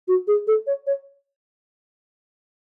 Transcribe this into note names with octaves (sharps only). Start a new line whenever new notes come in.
F#4
G#4
A4
C#5
C#5